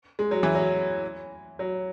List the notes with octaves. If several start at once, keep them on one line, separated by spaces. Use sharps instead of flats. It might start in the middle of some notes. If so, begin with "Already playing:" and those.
G#3
F#3
E3
F#3
F#3